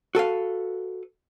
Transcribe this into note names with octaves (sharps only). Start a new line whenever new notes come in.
F#4 A4 B4 F5